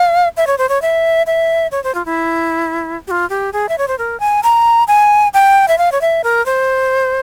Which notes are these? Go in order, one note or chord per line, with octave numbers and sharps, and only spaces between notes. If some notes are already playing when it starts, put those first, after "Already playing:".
Already playing: F5
E5
C#5
C5
C#5
E5
E5
C#5
C5
F4
E4
G4
F4
G4
G#4
E5
C#5
C5
A#4
G#5
A#5
G#5
G5
E5
F5
C#5
E5
A#4
C5